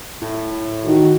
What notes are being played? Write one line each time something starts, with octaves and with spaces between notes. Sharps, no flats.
A2
D#3 F#4